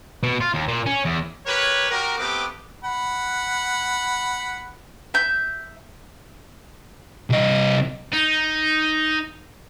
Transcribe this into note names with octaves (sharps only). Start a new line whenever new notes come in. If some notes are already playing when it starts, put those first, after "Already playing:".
B2
F4
D#2
A#2
C#4
E2
G4 A#4 B4 C#5
F#4 G4 A#4
A3 B3 C4 G4 D6
F#5 B5
E5 G6
C2 D#5
D#4